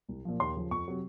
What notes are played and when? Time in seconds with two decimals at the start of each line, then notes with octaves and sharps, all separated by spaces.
0.09 C2
0.25 A#2 F3
0.40 D#2 C6
0.56 C#3 F3
0.71 F2 C#6
0.88 C3 F#3